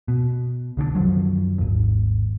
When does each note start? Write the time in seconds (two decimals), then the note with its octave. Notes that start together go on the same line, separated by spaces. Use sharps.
0.08 B2
0.77 C2 D3 F3 D4
0.95 F#2 D#3 F3 F#3
1.58 G#1 D#2